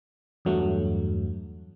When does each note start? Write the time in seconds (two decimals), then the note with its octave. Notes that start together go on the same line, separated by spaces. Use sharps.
0.45 E2 G2 F#3 A3